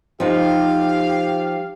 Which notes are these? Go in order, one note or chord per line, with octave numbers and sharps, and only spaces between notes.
F3 D#4 G4 F5